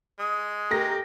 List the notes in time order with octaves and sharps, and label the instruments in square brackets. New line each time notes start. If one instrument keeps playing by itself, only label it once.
[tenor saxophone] G#3 [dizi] D#6
[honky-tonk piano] A3 A#4 A#6 [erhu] G4